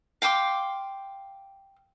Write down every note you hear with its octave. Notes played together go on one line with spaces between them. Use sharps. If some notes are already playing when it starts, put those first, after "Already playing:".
F5 G5 C6 D6